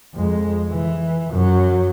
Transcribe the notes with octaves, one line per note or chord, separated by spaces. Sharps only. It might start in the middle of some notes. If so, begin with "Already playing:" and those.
F2 G#3
E3
F#2 F#3